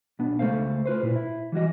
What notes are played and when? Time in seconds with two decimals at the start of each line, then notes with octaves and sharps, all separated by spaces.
0.19 B1 B3 D4
0.39 C#2 A3 A4 C5 F5
0.86 F4 B4 C5
1.03 A#2 E4
1.16 E4
1.52 E3 G3 F#4 D#5